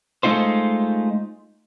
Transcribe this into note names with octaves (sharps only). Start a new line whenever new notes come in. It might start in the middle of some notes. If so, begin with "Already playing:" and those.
G#3 A3 D#4 F4 C5